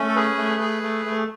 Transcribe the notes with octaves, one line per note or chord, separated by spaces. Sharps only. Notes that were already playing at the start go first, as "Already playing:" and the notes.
Already playing: A3 C#4
A4
G#4 B4
A3
G#4
A3
A3